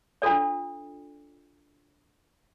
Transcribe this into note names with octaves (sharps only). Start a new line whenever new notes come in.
D4 F4 A4 D5